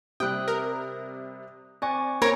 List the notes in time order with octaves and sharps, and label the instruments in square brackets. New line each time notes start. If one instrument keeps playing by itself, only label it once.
[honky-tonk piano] C3 G3 [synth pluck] G5 [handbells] D#6 F#6
[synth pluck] A#4
[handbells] C4 G#5 C#6 [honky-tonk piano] D5
[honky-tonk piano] A#3 C4 [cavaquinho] A#4 G#5 C#6 [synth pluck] C#5 A#5